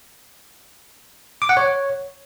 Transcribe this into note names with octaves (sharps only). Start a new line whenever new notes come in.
D6
F#5
C#5